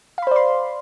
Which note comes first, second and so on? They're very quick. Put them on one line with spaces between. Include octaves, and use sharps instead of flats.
F5 B5 C5 D5 C6